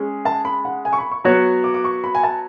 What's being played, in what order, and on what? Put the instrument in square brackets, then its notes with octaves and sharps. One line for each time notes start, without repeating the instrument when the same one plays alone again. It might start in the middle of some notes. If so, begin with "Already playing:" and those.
Already playing: [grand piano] G#3 C#4 G#4
[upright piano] A5
B5
F#5
G#5
C#6
B5
C#6
[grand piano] F#3 B3 F#4 C#5
[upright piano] D6
D6
C#6
B5
G#5
A5